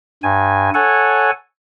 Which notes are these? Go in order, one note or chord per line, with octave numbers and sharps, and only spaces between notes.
G2 G#5
A4 C#5 F#5 G#5